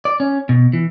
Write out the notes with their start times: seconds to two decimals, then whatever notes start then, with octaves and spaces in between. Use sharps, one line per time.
0.05 D5
0.20 C#4
0.49 B2
0.73 E3